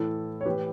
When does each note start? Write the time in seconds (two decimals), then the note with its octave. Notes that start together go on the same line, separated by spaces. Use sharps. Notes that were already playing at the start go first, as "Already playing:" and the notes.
Already playing: A2 E3 A4
0.41 C#5
0.45 A2 E3 G4 B4